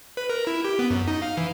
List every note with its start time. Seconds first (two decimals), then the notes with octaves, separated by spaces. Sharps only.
0.17 B4
0.29 A#4
0.47 E4
0.65 G4
0.79 B3
0.90 F#2
1.08 D#4
1.22 F5
1.37 E3